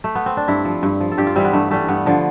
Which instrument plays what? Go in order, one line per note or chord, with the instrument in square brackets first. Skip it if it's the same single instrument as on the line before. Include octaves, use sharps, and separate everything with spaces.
[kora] A3
B3
C4
D4
G2 E4
F3
G2
F3
A4
G2 G4
F4
E3 G3 C4
B3
G2 A3
E3 G3 A3
G2 B3
D3 F3